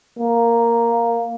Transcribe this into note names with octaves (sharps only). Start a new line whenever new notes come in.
A#3